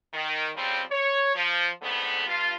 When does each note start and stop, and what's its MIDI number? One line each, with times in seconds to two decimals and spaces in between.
0.13 0.49 51
0.56 0.81 41
0.56 0.81 49
0.56 0.81 53
0.56 0.81 55
0.56 0.81 60
0.91 1.32 73
1.35 1.69 53
1.81 2.25 41
1.81 2.25 44
1.81 2.25 50
1.81 2.25 57
1.81 2.25 59
2.26 2.53 43
2.26 2.53 65